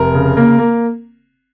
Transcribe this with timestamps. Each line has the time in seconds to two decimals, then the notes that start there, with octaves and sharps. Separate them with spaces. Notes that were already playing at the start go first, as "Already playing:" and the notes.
Already playing: F1 A#4
0.14 C#3
0.37 A#3
0.58 A#3